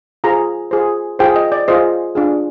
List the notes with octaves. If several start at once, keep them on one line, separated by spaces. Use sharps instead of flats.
F4 G#4 C5 A#5
F4 G#4 C5
F4 G#4 C5 G5
D#5
D5
F4 G#4 C5 D#5
D4 F4 G#4